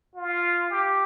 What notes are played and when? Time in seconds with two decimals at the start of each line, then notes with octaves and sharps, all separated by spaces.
0.15 F4
0.70 G4